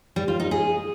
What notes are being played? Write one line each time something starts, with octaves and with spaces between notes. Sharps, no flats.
G3
F4
D#4
G#4